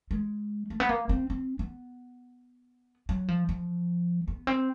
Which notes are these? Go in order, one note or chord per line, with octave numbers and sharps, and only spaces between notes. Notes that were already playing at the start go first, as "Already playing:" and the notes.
G#3
A3
B3
A#3
C4
C4
B3
F#3
F3
F3
B3
C4